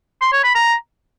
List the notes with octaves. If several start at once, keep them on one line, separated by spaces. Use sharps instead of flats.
C6
C#5
B5
A#5